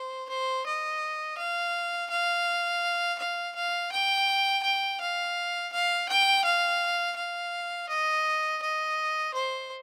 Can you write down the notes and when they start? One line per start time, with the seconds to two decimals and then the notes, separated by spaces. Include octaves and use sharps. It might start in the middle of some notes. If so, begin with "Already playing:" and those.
Already playing: C5
0.29 C5
0.66 D#5
1.38 F5
2.10 F5
3.18 F5
3.56 F5
3.92 G5
4.63 G5
5.00 F5
5.72 F5
6.09 G5
6.44 F5
7.16 F5
7.89 D#5
8.62 D#5
9.34 C5